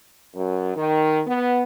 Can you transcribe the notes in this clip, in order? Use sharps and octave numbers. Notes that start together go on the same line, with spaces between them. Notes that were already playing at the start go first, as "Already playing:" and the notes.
F#2
D#3
B3